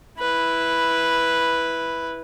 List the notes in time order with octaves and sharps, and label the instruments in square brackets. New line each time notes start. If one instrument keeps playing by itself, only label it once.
[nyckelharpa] E4 B4